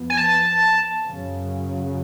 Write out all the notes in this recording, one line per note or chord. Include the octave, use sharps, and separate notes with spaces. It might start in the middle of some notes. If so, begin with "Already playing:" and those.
Already playing: F2 F3 B3
G#5
A5
F#2 C#3 F#3